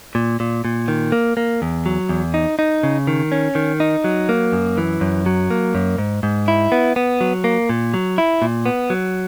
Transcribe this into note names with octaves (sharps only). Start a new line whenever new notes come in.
A#2
A#2
A#2
D#3
A#3
A#3
E2
F#3
E2
D#4
D#4
C#3
D#3
C#4
D#3
D#4
F#3
A#3
F#2
E3
F#2
F#3
A#3
F#2
G#2
G#2
E4
B3
B3
F#3
A#3
A#2
F#3
E4
A#2
B3
F#3